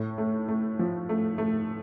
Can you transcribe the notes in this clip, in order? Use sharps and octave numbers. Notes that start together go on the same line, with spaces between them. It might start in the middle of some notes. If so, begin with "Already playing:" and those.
Already playing: A2
A3
A3
F3
A3
A3